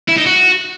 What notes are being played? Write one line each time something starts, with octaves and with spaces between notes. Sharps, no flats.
E4
D#4
F#4